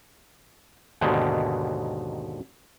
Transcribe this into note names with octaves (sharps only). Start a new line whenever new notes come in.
D#2 G#2 B2 D3 D#3